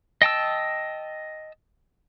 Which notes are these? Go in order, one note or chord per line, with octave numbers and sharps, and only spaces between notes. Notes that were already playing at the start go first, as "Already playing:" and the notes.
D#5 G5 A5 E6